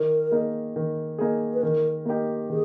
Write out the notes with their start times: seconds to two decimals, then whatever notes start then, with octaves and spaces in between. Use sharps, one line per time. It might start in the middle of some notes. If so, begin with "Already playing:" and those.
Already playing: D#3 A#4
0.31 A#3 D#4 G#4
0.76 D#3
1.19 A#3 D#4 G#4
1.54 B4
1.62 D#3 A#4
2.05 A#3 D#4 G4
2.50 D#3 G#4